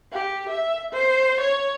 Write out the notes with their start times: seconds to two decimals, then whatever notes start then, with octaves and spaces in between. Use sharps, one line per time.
0.12 G4
0.49 E5
0.93 C5
1.40 C#5